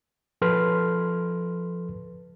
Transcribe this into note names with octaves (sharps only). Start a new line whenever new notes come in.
F3 A4 B4 C6 F6